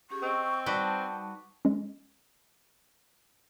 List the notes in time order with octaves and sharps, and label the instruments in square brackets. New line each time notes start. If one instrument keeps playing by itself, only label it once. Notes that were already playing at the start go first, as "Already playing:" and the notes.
[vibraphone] C#4 G4 G#4 [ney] C#6
[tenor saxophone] C4 [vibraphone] D#5 E6
[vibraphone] G3 D#4 [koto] F#4 B4 D5 [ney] A5
[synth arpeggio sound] G#3 C#4